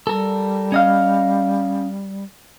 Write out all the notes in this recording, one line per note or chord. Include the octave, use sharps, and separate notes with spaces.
G3 A4 A#4
C#4 D#5 F5